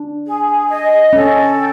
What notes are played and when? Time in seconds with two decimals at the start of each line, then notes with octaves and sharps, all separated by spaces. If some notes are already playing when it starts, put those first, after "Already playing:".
Already playing: D4
0.26 G#4
0.69 D#5
1.13 C#4 A4
1.57 G5